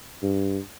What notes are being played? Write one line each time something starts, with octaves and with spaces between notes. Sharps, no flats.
G2